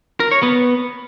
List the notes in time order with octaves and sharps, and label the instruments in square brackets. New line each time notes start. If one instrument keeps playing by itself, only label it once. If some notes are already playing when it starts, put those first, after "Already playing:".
[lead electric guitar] A#4
C#5
B3